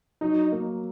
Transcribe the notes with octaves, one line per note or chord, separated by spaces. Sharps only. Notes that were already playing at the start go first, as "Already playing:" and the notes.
F#3 D#4
A#3